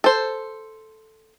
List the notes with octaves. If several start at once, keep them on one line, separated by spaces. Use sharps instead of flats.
A4 C5